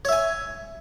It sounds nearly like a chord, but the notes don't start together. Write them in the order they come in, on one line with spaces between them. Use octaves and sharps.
C#5 E5 G#5